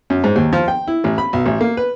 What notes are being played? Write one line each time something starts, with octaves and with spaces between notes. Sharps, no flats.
F#2
G#2
D#2
F3
G5
E4
A1
B5
B1
A1
A#3
B4